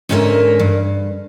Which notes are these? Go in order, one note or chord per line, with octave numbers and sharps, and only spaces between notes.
E2 G#2 D3 C#4 A#4 E5
G2